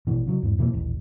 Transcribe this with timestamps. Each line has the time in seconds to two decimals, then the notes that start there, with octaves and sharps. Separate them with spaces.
0.07 A1 B2 E3
0.27 C#3 F#3
0.43 E2 G#2
0.59 B2 E3 F#3 A#3
0.73 D#1 A1